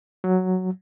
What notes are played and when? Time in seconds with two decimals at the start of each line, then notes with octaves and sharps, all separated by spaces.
0.24 F#3